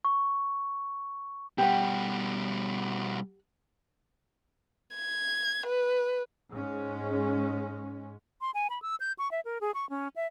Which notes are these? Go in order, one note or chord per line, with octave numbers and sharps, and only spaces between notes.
C#6
B2 G3 G4 F#5
G#6
B4
G#2 G#3 C#4
C6
G#5
B5
E6
G6
C#6
E5
A#4
G#4
C#6
C#4
E5